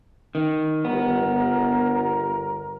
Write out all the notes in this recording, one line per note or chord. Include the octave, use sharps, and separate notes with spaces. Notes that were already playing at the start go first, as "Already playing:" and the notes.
D#3
G1 B3 A#4